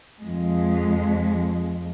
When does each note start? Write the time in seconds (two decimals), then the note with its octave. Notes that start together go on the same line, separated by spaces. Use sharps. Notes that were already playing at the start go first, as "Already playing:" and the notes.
0.21 F2 G#3